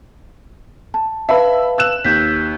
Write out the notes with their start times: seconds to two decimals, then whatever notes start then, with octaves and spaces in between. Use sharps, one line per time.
0.94 A5
1.29 B4 E5 F5 A5 B5
1.78 E6 F#6 E7
2.05 D#2 G6 B6